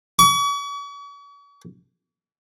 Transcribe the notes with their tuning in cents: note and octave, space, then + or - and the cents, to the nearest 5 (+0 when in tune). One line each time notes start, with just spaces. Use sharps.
C#6 +45